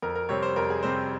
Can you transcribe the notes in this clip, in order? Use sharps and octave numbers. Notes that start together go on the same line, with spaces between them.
F2 A#4
A#4
C3 G3 C4 C#5
C5
F2 A#4
G#4
C3 G3 C4 C5